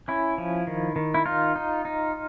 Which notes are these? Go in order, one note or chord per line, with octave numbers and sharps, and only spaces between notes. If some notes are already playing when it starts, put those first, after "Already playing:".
C#4 E4
F3
D#3
D#3
E4
D#4 F4
D#4
D#4